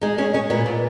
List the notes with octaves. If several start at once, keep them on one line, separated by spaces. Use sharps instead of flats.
G#3 D#4
G#3 C#4
G#3 C#4
A#2 B3
A#2